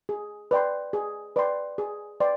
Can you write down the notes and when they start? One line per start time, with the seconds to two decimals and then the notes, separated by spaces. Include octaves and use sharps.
0.09 G#4
0.51 B4 D5 G5 C6
0.93 G#4
1.36 B4 D5 G5 C6
1.78 G#4
2.20 B4 D5 G5 C6